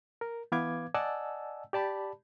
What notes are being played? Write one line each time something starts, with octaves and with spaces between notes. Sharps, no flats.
A#4
E3 B3 B4 F5 D6 G#6
D5 D#5 F#5 G#5 A5 E6
G4 D5 A5 B5